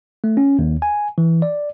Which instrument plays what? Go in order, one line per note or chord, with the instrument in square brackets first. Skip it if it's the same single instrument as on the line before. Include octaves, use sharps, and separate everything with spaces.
[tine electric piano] A3
C#4
D#2
G#5
E3
D5